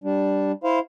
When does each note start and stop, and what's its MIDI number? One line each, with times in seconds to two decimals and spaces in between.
0.04 0.52 55
0.04 0.52 62
0.64 0.79 64
0.64 0.79 72
0.64 0.79 77